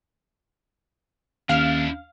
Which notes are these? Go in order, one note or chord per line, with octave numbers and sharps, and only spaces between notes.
D#2 C#4 D4 E4 F5 F6